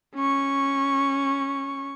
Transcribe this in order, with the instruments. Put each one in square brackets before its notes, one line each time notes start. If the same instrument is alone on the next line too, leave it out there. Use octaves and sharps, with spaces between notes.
[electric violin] C#4 C#6